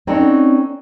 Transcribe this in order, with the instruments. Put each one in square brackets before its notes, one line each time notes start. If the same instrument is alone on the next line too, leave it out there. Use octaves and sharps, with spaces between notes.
[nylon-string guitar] C4 C#4 D#4 A4 D5 F#5